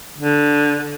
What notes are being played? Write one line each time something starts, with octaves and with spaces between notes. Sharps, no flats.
D3